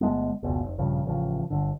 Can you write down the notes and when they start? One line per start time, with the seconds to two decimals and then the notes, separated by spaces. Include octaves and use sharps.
0.01 G1 G#3 A3 B3
0.43 F1 C#2 B2
0.63 F1
0.78 A#1 G2 C#3 F3
1.05 A1 C#3 F3
1.50 G1 D3